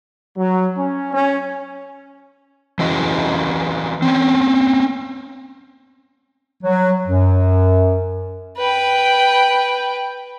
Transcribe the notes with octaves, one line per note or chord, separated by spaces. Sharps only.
F#3
C#4
C#4
E3 C#4 F#4 D#5
C4 C#4
F#3
F#2
B4 G5